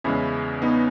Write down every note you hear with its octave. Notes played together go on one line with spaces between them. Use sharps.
E2 C#3 G#3 C#4 E4
B3 D#4